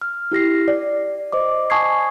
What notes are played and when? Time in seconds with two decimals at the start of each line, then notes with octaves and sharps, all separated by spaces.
0.02 F6
0.32 E4 G4 A#6 C7
0.68 D5
1.32 C5 D#5 D6
1.70 G#5 A5 C#6 D#6 G#6 C7